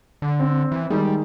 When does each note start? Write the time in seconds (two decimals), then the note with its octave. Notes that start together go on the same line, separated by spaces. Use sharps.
0.22 D3
0.40 C4
0.72 E3
0.90 D#3 G3 G#3